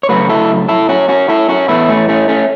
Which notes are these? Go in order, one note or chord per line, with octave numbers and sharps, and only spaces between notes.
C#5
C#3 F#3 A3 F#4 B4
E4 A4
E4 A4
C#4 F#4
C#4 F#4
E4 A4
C#4 F#4
A2 E3 A3 B3 E4
A3 C#4
A3 C#4
A3 C#4